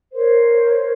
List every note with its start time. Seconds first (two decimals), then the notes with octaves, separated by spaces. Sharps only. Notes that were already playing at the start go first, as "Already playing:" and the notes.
0.13 A#4 C5 C#5